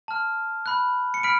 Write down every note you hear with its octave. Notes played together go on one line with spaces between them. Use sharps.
A5 F6
B5 F#6
C#7
B5 F6 B6 D7